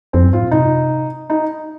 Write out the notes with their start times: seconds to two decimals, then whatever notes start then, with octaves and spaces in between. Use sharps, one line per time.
0.13 F2 C4
0.23 F#2
0.33 G#2 F4
0.42 A#2
0.51 C3 D#4
1.30 D#4